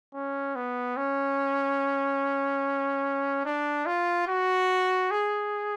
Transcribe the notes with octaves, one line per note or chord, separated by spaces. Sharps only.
C#4
B3
C#4
D4
F4
F#4
G#4